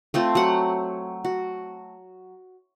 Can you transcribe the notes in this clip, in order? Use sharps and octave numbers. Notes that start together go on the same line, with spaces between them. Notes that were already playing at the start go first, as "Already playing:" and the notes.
A3 C4 F4
F#3 F#5
F#4